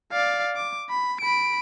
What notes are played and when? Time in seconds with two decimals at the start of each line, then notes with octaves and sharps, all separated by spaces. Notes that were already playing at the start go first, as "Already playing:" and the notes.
0.12 D5 F5
0.56 D6
0.90 B5
1.21 B5 D7